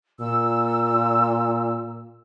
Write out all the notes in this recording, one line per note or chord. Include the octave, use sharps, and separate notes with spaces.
A#2 E6